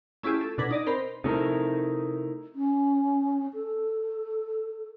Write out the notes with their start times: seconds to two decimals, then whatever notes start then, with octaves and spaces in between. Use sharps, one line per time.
0.23 A3 C#4 E4 F4 G4 G#4
0.41 A4
0.58 B2 D4 B4 G#6 A#6 B6
0.71 D#4 D5 D#5
0.87 C4 A#4 C5 B5
1.24 C3 A3 D#4 E4 A#4
2.55 C#4
3.54 A4